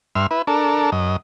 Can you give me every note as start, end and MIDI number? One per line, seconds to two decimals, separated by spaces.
0.15 0.27 43
0.15 0.27 76
0.15 0.27 84
0.15 0.27 89
0.31 0.42 64
0.31 0.42 71
0.47 0.90 62
0.47 0.90 69
0.47 0.90 70
0.92 1.16 42
0.92 1.16 75